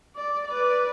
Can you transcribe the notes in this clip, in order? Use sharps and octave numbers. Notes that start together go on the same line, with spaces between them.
D5
B4 D5